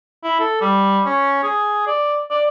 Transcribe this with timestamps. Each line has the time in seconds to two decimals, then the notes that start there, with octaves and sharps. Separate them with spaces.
0.24 E4
0.40 A4
0.61 G3
1.06 C#4
1.43 G#4
1.87 D5
2.30 D5